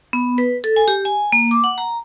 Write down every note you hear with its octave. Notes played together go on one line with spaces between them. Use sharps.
B3
B4
A4
G#5
G4
G#5
A#3
D6
F#5
A#5